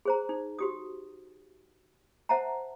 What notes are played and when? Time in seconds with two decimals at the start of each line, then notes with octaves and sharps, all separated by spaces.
0.05 G#4 C5 A#5
0.29 D#4
0.59 F#4 G4 D#6
2.29 C5 E5 F#5 A5 A#5